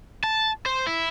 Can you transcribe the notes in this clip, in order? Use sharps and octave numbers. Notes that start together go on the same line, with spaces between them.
A5
C5
E4